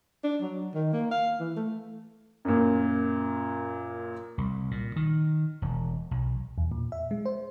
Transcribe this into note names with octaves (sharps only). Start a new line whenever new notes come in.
D4
F#3
D#3
A#3
F5
E3
A3
F#2 A#2
C2
A#2
D#3
E1
B1
E2
A#2
E5
G#3
C5